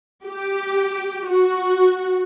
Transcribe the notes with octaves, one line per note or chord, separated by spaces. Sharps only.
G4
F#4